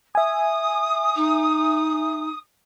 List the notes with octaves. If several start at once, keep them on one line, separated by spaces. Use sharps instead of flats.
E5 G#5 D#6
D#4